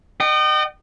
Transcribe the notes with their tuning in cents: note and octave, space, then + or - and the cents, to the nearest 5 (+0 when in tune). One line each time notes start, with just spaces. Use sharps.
D#5 -35 G5 -35